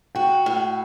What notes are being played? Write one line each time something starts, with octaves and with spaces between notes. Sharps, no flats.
F#4 G5
A2